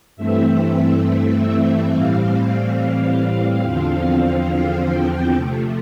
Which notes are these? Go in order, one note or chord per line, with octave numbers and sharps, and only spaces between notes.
G2 E3 A3 C4 E5
E5
A2 E3 G3 C4 F5
E2 D3 F3 C4
F5
G5
C3 F3 A3